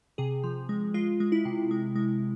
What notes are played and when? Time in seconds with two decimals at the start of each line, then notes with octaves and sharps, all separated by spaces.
0.18 C3 G#4
0.44 F3
0.69 G#3
0.94 G#3 F4
1.20 G#3
1.32 E4
1.45 C3
1.71 G#3
1.96 G#3